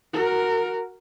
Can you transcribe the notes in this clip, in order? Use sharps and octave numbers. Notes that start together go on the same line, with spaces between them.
F#4 A#4